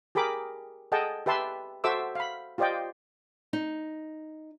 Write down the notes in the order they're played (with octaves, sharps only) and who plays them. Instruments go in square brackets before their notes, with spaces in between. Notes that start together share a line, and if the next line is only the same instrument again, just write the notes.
[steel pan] G4 G#4 A#4 B5 D6
G#4 A4 D#5 F#5 G5 A5
G4 B4 E5 A5 C6
F#4 A4 C5 E5 D6 E6
F5 B5
F4 G4 C5 D5 D#5 G5
[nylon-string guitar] D#4